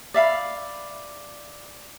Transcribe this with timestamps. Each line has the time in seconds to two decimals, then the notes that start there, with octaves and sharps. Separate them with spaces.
0.14 D5 E5 F5 B5